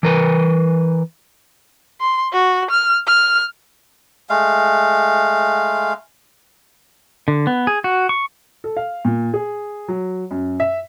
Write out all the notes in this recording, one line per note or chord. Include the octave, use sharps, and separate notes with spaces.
E3 A#4 B4
C6
F#4
F6
F6
G#3 A3 F5
D3
B3
G#4
F#4
C#6
A4
F5
A#2
G#4
F#3
F#2
E5